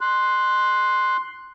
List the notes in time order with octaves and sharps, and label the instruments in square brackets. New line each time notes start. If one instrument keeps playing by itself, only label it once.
[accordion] C6 F#6